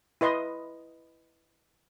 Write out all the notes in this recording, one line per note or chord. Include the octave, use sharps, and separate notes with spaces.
E4 B4 D#5 C6